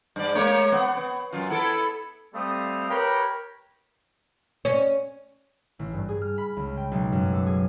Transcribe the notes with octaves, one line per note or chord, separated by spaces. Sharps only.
G2 D5
G#3 A#3 C#5
B3
B3
F#2 F4
B3 E4 A4
G3 A3 C4 F5 D#6
G4 A#4 B4 C#5 G5 B5
C#4
A1
G2
G#4
F6
B5
C#2
G5
B1
F#2
A4
G#4